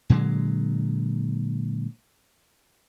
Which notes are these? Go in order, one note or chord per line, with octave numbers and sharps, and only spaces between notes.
A#2 D3 F#3 G#3